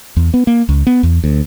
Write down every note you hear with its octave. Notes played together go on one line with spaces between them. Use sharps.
E2
B3
A#3
C#2
B3
E2
D2